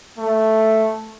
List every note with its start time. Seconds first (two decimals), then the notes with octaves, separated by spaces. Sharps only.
0.18 A3